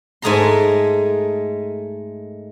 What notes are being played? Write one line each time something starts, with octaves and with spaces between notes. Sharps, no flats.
G#2 G#3 A3 G#4 A#5 C6